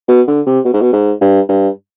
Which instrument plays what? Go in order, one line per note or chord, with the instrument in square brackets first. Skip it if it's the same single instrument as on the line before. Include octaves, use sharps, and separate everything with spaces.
[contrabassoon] B2
D3
C3
B2
G#2
B2
G#2
G2
G2